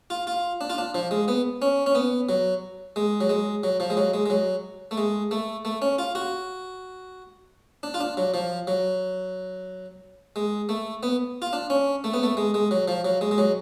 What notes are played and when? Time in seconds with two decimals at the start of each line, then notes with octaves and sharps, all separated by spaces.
0.10 F4
0.27 F4
0.61 D4
0.70 F4
0.78 D4
0.95 F3
1.11 G#3
1.28 B3
1.62 C#4
1.86 C#4
1.95 B3
2.29 F#3
2.96 G#3
3.21 F#3
3.29 G#3
3.64 F#3
3.80 F3
3.90 G#3
3.97 F#3
4.14 G#3
4.26 G#3
4.30 F#3
4.91 A3
4.98 G#3
5.31 A3
5.65 A3
5.82 C#4
5.98 F4
6.15 F#4
7.83 D4
7.94 F4
8.00 D4
8.17 F#3
8.34 F3
8.67 F#3
10.36 G#3
10.69 A3
11.03 B3
11.42 F4
11.53 D4
11.70 C#4
12.04 A3
12.14 B3
12.23 A3
12.37 G#3
12.54 G#3
12.71 F#3
12.88 F3
13.05 F#3
13.21 G#3
13.31 G#3
13.38 F#3